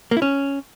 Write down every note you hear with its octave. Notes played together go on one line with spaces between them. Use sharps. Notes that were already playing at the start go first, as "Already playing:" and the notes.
A#3
E4
C#4